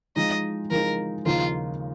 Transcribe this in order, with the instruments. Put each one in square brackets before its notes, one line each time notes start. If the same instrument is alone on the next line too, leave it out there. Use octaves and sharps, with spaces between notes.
[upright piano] F3 G#3 D#4 [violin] D#5
[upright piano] F3 G#3 D#4 [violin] A#4
[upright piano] D#2 C#3 F3 A#3 D#4 [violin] F4